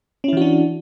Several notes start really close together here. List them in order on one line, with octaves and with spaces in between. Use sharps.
C#4 E4 E3 F#4 D4